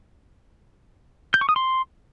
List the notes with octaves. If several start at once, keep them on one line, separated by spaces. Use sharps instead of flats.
G6
C#6
D#6
C6